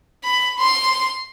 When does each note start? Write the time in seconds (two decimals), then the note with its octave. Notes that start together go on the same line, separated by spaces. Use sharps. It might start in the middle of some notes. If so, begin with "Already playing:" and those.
0.24 B5
0.59 C6